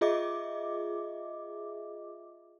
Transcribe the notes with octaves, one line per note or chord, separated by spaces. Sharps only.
F4 G#4 D#5 E5 D6